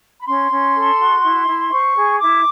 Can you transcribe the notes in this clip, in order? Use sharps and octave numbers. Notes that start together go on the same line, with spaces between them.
B5
C#4 C6
C#4
A4
F#4
E4
E4
C5 C#6
G#4
E4 D6